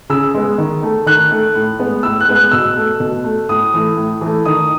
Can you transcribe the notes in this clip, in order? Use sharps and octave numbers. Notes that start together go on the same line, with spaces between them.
C#3 E6
G#3 B3
D#3
A3
D#3 F#6
A3
A2
G#3 B3
A2 E6
F#6
G#3 B3
F#6
B2 E6
A3
B2
A3
A2 D#6
E3 A3
A2
E3 A3
D#3 D#6